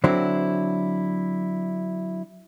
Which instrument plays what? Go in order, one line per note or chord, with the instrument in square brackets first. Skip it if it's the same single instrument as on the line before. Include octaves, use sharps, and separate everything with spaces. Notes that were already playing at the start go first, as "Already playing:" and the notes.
[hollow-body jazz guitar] D3 F#3 C4 D4 E4